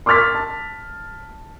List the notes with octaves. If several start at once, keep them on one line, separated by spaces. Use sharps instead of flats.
C6 D6 E6 F6 A6 B6
A5